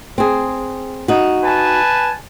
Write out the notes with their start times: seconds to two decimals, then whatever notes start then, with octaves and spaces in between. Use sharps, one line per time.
0.18 C4 G#4
1.08 D#4 F#4
1.42 B4 G#5 A5